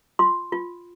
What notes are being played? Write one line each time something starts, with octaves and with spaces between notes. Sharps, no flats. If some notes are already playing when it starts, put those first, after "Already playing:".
F4 C6
F4